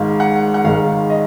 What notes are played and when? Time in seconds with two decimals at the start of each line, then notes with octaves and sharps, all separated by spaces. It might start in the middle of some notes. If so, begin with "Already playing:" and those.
Already playing: G#1 G#2 D#3 F5
0.20 F#5
0.54 F#5
0.65 G#1 G#2 D#3 F5
1.10 D#5